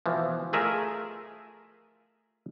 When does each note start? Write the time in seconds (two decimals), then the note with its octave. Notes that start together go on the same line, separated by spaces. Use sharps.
0.06 B2 E3 F3
0.53 A3 F4 G#4 A#4 D#5 E5